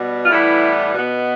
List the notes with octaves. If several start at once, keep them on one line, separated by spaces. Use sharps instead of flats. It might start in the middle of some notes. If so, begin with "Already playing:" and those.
Already playing: B2 G3 B3
F4
A2 E3 G3 B3 E4
B2 B3